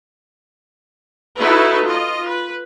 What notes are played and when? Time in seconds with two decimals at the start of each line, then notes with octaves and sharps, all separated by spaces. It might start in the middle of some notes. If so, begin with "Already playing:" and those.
1.39 D#4 E4 F#4 A4 B4
1.85 F4 D#5
2.27 B4